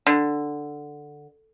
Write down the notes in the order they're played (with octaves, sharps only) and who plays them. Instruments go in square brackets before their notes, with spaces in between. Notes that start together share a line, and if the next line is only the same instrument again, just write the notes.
[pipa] D3